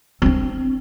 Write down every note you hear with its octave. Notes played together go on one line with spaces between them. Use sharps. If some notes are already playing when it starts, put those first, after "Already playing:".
C4 D4